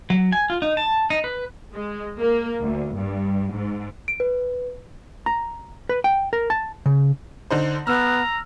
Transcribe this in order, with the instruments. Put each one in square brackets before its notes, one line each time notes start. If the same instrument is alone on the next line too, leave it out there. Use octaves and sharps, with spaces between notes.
[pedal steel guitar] F#3
G#5
F4
D#4
A5
D#4
B4
[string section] G#3
A#3
D2
G2
G#2
[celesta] D7
B4
[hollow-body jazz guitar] A#5
B4
G5
A#4
A5
C#3
[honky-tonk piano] D3 D#4 C5
[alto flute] B3 [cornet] A#5 [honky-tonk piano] E6 F6